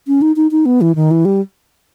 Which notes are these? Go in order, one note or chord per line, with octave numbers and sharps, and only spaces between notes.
C#4
D#4
D#4
D#4
B3
E3
D#3
E3
G3